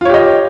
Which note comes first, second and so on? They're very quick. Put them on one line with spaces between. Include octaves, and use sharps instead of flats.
F4 C#5 G4 D#5